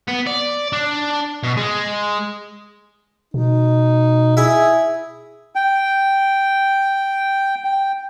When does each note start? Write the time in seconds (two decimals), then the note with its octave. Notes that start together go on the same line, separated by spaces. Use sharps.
0.07 B3
0.26 D5
0.73 D4
1.43 B2
1.57 G#3
3.34 B2 D#4
4.37 E4 G#4
5.55 G5
7.64 G5